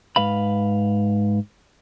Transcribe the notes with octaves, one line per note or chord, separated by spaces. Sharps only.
G#2 B4 F5 B5